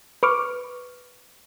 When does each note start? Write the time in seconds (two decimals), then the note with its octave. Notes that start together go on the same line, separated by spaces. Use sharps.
0.23 B4 C#6 D6 F6